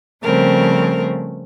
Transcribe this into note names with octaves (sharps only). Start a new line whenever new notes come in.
C#3 F3 G3 A3 C4 A#4